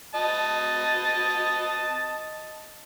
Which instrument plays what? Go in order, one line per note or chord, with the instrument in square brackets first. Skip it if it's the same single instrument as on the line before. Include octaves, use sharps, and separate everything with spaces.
[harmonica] D#5 A5